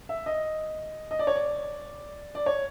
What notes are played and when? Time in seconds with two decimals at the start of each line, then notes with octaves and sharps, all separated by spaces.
0.09 E5
0.26 D#5
1.11 D#5
1.19 D5
1.27 C#5
1.35 D5
2.35 D5
2.46 C#5